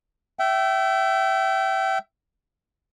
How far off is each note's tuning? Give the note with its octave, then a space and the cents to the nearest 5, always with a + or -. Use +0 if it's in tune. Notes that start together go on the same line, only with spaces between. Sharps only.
E5 +15 G5 -30